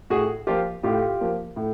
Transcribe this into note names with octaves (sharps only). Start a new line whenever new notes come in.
A2 F#4 G#4
F3 A#3 F4 G4
A2 F4 G4
F3 A#3
A2